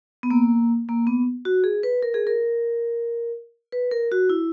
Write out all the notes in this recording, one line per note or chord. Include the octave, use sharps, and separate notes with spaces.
B3
A#3
A#3
B3
F#4
G#4
B4
A#4
G#4
A#4
B4
A#4
F#4
E4